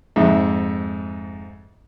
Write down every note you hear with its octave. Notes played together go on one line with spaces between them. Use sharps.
F2 G#2 E5